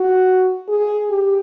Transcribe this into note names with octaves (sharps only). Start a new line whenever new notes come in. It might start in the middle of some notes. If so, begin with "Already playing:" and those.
Already playing: F#4
G#4
G4